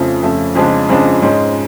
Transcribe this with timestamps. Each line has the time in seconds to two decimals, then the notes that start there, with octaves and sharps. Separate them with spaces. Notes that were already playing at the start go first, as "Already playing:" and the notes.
Already playing: F2 C#3 F3 A3
0.22 F2 C#3 F3 A3
0.55 F2 C#3 F3 G#3 D4
0.89 F2 C#3 F3 G#3 D4
1.22 G#2 G#3 C#4